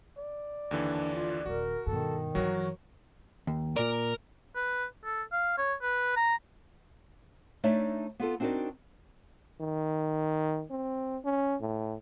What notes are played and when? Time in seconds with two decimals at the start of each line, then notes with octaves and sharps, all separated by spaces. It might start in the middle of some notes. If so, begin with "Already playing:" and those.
0.18 D5
0.71 D#2 D3 E3 D4
1.14 F4
1.46 D#1 D#3 F#4 A#4
1.87 G2 B2 D#3 A4
2.35 G2 E3 F#3 F#4 A#4 C#5
3.47 D#2
3.77 A#2 A#4 D5
4.55 B4
5.04 A4
5.32 F5
5.58 C#5
5.82 B4
6.16 A#5
7.64 A3 D4 D#4 C#5 D5 E5
8.19 B3 F4 A4
8.40 C4 D4 D#4 F#4 A#4 D5
9.61 D#3
10.71 C4
11.25 C#4
11.61 A2